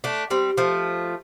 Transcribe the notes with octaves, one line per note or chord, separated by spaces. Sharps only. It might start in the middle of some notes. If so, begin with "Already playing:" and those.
A3 D4
G3 C4
F3 A3